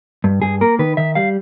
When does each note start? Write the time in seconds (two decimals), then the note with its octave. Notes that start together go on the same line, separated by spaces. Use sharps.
0.24 G2
0.42 G2 G#4
0.61 A#3 A#4
0.79 D#3 B4
0.97 D#3 E5
1.15 G3 F5